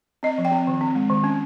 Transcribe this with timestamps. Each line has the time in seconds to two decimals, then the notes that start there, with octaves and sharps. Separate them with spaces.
0.23 C4 D#5
0.38 F3
0.45 G5
0.52 C4
0.67 D#3
0.81 C4
0.95 G#3
1.10 D#3
1.24 C#4